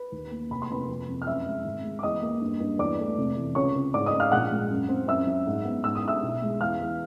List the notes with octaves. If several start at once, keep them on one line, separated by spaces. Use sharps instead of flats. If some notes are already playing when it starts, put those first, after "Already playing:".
Already playing: B4
D#2
A#3
F1 B5
C6
F1 B4 B5
F2
F2
F6
F#2 E5 E6
G#3
G#1
G#3
D6
E2 D#5 D#6
A#3
G2
G2
E2 D5 D6
A3
F1
E3
C#2 C#5 C#6
C#2
G#2 D5 D6
D#5 D#6
G#2
F5 F6
A#1 F#5 F#6
G#3
F#2
C4
F#2 E5 E6
F#2
G#2
B3
G#2 E6
D#6
D4 E5 E6
B1
G#3
E2 F5 F6
E2